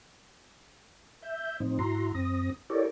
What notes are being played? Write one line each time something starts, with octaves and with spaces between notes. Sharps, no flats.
E5 G6
A2 F3 C4 D#4
G#2 E4 F#4 A#5 C6
F#2 C4 D#6 A#6
E4 G4 A4 A#4 C#5 D5